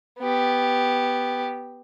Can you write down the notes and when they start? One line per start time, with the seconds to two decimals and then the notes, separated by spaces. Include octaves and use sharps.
0.20 B3 G4